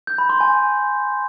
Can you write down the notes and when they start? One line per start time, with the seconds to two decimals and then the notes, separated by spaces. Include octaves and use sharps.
0.07 G6
0.18 B5
0.29 C6
0.40 G#5